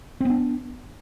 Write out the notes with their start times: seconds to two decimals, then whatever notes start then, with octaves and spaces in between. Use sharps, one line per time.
0.20 C4
0.25 B3
0.30 D4